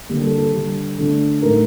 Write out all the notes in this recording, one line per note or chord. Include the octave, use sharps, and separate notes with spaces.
D3 G3 A#3
A4
A4
D3 G3 D4
D3 A3 D4
A2 A3 D#4 A#4